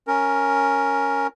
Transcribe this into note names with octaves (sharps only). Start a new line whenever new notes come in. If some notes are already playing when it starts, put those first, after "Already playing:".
C#4 A#4